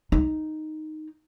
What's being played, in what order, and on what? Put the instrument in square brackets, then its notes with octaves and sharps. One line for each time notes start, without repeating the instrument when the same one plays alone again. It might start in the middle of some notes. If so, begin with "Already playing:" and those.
[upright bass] D#4